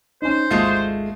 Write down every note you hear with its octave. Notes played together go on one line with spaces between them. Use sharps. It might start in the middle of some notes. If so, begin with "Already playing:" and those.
C#4 D#4 C5
G#1 D2 G#3 A3 F4 C7